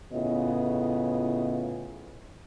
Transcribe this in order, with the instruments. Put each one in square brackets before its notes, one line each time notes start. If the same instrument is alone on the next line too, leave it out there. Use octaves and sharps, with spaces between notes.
[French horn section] A2 C#3 B3 E4 F4 D#5